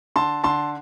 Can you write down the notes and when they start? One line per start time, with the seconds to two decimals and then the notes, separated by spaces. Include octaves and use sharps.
0.16 D3 A5 C6
0.44 D3 A5 C6